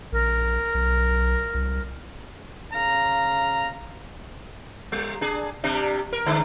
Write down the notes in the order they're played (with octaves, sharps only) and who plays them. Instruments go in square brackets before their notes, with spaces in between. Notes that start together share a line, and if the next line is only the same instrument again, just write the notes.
[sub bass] A#1 [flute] A#4
[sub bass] B1
C2
[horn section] C#3 F5 A#5
[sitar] G3
D4 G#4
C3 G3 D4
A#4
D3 G#3 D4